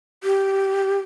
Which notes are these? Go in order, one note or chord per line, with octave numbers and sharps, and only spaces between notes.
G4